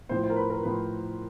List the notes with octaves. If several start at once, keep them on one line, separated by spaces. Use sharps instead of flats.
A2 F3 C5
C5
A#4
B4
A#4
A2 F3 B4